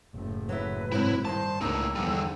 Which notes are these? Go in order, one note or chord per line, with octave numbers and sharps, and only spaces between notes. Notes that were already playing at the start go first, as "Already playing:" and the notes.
F#1 A2
F#3 E4 B4
G#2 C3 F#3 E4
G2 D#3 C5 A5
C#2 A2 A#3 D4 D#4 E6
E2 D3 F3 G3